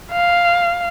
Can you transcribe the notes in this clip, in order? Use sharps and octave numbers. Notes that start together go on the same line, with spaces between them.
F5